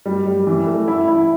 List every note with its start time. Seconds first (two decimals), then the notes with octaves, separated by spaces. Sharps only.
0.06 G3
0.26 G3
0.47 E3
0.67 A3
0.88 E4
1.08 E4